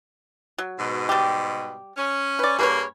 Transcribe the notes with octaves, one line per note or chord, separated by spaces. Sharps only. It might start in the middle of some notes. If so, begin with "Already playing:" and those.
F#3
G#2 B2
G3 G4
C#4
B4 D5
G2 A#3 G#4 B4 C#5